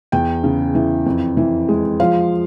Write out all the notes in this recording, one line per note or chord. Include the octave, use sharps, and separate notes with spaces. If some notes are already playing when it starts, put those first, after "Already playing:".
E2 G5
C#3
E3
F2
E3
G#3
F3 F5